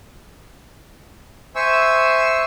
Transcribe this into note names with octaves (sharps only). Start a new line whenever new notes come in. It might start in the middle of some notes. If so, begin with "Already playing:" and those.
C5 E5 G#5 C#6 E6